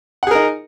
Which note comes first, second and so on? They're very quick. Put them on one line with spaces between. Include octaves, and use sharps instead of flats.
F#5 G#4 A#4 D#4